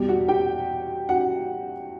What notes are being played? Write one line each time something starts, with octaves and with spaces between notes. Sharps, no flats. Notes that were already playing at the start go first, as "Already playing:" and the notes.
Already playing: E2 B2 G3 G4
F#4 F#5
G4 G5
F#4 F#5